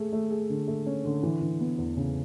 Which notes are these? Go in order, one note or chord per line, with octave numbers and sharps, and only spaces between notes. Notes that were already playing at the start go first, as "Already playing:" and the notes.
Already playing: A3 G#4
A3
G#4
D3
A3
C#4
D3
E3
E3
B3
E2
C#3